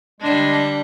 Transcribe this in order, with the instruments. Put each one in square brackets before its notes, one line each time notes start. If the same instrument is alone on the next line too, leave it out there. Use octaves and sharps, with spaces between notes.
[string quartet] D3 G3 [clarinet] G#3 [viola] D4